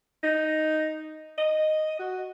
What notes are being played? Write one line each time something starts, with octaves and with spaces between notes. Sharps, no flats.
D#4
D#5
F#4